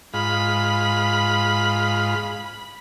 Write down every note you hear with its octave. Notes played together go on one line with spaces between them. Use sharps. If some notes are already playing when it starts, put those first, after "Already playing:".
G#2 F4 B5